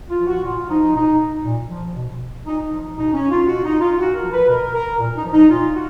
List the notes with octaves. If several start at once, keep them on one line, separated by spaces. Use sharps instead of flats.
F4
F3
F#4
A#2 F4
F3 D#4
B2 D#4
A#2
F3
B2
A#2 D#4
D#4
F3
B2 D#4
C#4
F4
B2 F#4
D#4
F4
A#2 F#4
A#4
F3
B4
B2 A#4
A#4
A#2
D#4
F3
D#4
A#2 F4
F#4